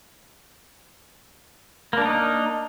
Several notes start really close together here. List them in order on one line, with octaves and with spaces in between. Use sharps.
A#3 D4 A#4 D#4